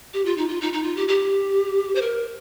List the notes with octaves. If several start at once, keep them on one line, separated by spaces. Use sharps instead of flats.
G4
F4
D#4
F4
D#4
D#4
F4
G4
G4
C5
A#4